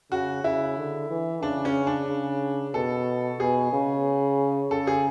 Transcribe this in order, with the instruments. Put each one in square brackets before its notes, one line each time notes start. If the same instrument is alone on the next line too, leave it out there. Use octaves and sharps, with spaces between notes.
[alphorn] C#3 [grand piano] F#4
[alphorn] C#3 [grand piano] E4
[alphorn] D3
E3
[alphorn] C#3 [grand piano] D4
[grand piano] C#4
D4
[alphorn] C#3
[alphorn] B2 [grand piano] A4
[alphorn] B2 [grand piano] G#4
[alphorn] C#3
[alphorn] C#3 [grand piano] A4
[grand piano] G#4